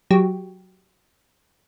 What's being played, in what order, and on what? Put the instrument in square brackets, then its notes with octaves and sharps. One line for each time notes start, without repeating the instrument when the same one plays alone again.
[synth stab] F#3 G4